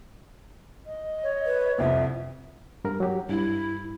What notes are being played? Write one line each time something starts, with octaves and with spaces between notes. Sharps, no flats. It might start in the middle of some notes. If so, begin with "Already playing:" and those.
D#5
C#5
B4
C2 F2 C5 E5
G2 A#4
F#3 G4
G2 E4